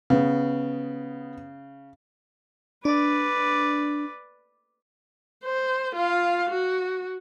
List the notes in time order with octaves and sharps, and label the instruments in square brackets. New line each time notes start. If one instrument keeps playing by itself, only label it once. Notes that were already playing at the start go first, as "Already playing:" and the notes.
[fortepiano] C#3 [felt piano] B3
[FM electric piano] D4 [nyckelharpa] B4 D5
[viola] C5
F4 F5
F#4